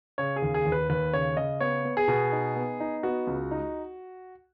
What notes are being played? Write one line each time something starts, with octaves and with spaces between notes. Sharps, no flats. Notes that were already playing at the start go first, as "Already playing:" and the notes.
C#3 C#5
G#4
D#2
G#4
D#2
B4
D#2 B4
C#3 C#5
C#3 D#5
B3 C#5
B3
G#4
B2
D#4
B3
D#4
B3 F#4
C#2
D#4